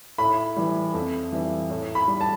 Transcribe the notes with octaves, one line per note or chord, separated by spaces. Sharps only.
A2 B5
E3 G3
F2
E3 G3
A2
B5
G3
A5